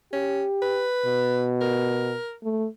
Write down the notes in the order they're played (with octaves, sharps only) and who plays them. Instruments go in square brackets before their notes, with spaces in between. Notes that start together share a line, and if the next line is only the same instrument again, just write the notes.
[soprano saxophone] C#4 [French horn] G4
[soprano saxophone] B4
[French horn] B2
[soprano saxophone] A#4
[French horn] A3